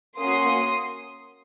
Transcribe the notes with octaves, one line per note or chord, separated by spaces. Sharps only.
A#3 C#4 F#4 C6 D#6